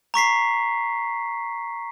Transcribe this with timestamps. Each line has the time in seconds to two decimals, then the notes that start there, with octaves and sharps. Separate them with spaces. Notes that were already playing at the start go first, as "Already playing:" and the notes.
0.14 A#5 C#6 B6 C7